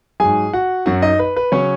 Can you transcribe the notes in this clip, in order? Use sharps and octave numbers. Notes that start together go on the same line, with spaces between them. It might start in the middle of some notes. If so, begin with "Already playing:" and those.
G#2 F#3 G#4 G#5
F#4 F#5
F#2 F#3 F#4 F#5
D#4 D#5
B4
B4
C#3 F#3 C#4 C#5